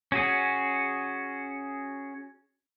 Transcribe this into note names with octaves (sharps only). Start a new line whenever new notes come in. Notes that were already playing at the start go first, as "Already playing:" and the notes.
C#4 F#4 G#4